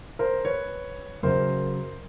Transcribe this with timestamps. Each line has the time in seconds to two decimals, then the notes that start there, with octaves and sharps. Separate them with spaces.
0.19 A#4 C5
0.45 B4 C#5
1.23 F#2 C#3 F#3 A#4 C5